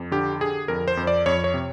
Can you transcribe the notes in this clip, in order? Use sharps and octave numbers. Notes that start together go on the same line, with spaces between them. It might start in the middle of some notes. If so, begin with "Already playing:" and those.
Already playing: F2
D3 G4
D3 G#4
F2 A#4
C5
F2
D5
F2 C#5
C#5
C3